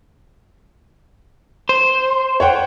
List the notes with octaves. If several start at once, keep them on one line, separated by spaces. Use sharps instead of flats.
C5
C#5 F#5 G5